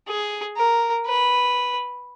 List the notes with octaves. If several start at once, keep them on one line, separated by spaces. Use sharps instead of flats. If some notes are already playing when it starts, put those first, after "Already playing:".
G#4
A#4
B4